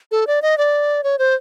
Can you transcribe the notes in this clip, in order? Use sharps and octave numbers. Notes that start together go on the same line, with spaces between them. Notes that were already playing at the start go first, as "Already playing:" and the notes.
A4
D5
D#5
D5
C#5
C5